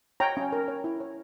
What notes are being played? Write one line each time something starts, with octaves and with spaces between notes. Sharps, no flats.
C#5 G5 A#5
C#4
A#4
C#5
E4
C#5